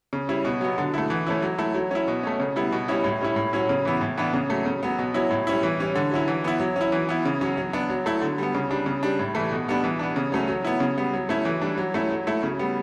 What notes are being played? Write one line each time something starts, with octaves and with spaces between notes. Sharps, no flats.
C#3
G3 C#4 E4
B2
F#3 B3
D3
A3 E4
E3
A3 C#4 E4
F#3
A3 E4
F#3
C#4 E4
B2
A3 C#4
C#3
G3 B3 E4
B2
G3 C#4 E4
A2
G3 C#4 E4
A2
F#3 C#4 E4
C#3
E3 B3 E4
A2
E3 B3 D4
C#3
F#3 A3
C#3
F#3 B3
B2
F#3 C#4 E4
A2
G3 C#4 E4
E3
G3 C#4
D3
F#3 C#4 E4
E3
B3 E4
F#3
C#4 E4
E3
B3 E4
C#3
F#3 C#4
F#3
B3 D4
F#3
A3 E4
D3
G3 B3
C#3
G3 D4
C#3
G3 D4
A2
E3 A3
B2
G3 B3 D4
E3
B3 D4
C#3
F#3 A3 C#4
F#3
B3 E4
C#3
G3 B3
F#3
A3 C#4 E4
E3
G3 D4
F#3
A3 C#4 E4
F#3
A3 E4
C#3
G3 B3